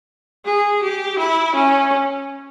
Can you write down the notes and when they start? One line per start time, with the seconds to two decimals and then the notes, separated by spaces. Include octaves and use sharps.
0.45 G#4
0.83 G4
1.19 E4
1.55 C#4